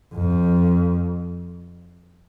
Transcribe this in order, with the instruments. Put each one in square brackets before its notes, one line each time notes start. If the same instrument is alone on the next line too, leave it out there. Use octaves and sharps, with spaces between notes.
[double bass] F2